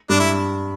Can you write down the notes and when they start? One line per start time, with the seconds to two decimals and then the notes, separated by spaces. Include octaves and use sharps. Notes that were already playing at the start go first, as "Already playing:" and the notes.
0.09 G2 D4
0.19 E4